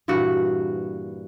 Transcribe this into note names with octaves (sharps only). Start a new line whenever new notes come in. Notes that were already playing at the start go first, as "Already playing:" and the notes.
G2 A#2 E3 F#4